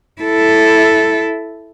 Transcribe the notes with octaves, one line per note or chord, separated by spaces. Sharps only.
E4 A4